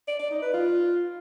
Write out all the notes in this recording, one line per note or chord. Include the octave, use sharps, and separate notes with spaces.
D5
D5
D#4
B4
F4